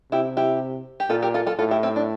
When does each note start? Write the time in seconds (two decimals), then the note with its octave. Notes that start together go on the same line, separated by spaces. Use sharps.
0.12 C3 E4 G4
0.37 E4 G4
1.00 G4
1.10 A#2 F4 A4
1.22 G4 A#4
1.34 F4 A4
1.46 F4 A4
1.59 A2 F4 A4
1.71 E4 G4
1.83 C4 E4
1.96 D4